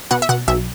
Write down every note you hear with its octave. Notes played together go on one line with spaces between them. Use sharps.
B2 F#5
E5
B2 F#5
B1 E5